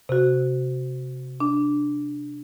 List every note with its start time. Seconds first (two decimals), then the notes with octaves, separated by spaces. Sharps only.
0.09 C3 F#4
1.40 D4